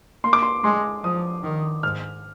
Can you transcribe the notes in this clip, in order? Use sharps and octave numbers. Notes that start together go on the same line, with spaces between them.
A#3 C6
D6
C6
G#3 C6
F3 D#6
D#3
G#2 F6